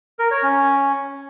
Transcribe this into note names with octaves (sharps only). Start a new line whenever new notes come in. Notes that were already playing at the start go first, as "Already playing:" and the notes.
A#4
C#5
C#4